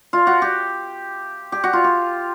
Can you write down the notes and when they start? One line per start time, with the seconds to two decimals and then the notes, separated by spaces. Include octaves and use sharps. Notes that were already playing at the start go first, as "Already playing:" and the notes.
0.13 F4
0.27 F#4
0.42 G4
1.52 G4
1.64 F#4
1.73 F4
1.84 G4